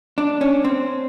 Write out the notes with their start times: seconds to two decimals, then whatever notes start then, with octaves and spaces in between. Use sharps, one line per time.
0.18 D4
0.41 C#4
0.64 C4